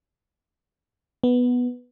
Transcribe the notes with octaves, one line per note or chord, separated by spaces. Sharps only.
B3